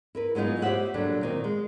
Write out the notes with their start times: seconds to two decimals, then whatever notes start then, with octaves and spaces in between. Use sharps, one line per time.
0.15 E4 A#4 B4
0.35 F#3 G#3 B3 D#4 F4
0.62 G4 C5 C#5 E5 F#5
0.94 A#2 D3 F#3 G3
1.21 A#2 D#3 C4
1.44 G#3